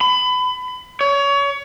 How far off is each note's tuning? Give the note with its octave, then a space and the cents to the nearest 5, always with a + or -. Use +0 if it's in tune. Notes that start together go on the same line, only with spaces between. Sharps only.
B5 +25
C#5 +25